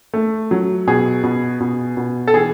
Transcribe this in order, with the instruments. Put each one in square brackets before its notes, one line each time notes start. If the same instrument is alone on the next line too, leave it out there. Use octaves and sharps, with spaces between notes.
[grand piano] A3
F#3
B2 G#4
B2
B2
B2
A4
E3 G#4